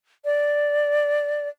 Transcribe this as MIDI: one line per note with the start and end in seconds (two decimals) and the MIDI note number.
0.25 1.48 74